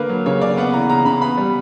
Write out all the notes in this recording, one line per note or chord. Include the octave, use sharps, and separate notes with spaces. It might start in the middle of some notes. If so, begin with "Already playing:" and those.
Already playing: D3 A#3 B4
F#3
C#3 C#5
C#3 D5
B3 F#5
E3 A#5
C#3 A#5
C#3 B5
B3 B5
G3